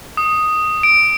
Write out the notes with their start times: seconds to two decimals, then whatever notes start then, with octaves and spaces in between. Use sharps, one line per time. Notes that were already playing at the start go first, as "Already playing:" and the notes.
0.17 D#6
0.83 D7